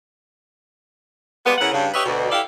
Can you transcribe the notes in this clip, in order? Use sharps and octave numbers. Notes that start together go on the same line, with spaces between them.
G3 G#3 A#3 B3
C#3 E4 A#4 F#5
G2 C#3
G4 B4 C#5 D#5 E5
D2 B2
E4 G4 A4 D5 F5